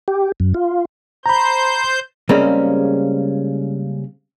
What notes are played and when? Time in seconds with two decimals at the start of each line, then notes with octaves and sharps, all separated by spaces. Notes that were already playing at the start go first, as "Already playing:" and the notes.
0.08 G4
0.40 F#2
0.54 F4
1.26 C5 A#5 B5 G6
2.29 C#3 G3 G#3 A#3 C4 C#4